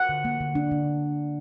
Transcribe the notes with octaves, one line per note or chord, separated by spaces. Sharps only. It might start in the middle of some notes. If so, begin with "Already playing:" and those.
Already playing: F#5
D3
A#3
D3
D4
D3